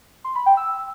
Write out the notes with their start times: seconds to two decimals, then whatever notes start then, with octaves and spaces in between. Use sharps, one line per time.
0.24 C6
0.35 B5
0.46 G5
0.57 E6